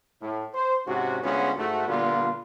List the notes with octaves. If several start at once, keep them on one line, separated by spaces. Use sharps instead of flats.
A2
C5
G#2 C3 C#4 F#4
D2 G#3 B3 C#4 F4 F#4
G#2 A3 F#4
A#2 D3 G3 B3 F4